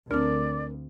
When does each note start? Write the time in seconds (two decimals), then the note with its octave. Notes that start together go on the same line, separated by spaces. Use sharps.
0.11 D2 C4 D4 A#4 D5